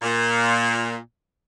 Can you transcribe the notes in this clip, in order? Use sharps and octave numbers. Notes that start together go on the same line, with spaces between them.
A#2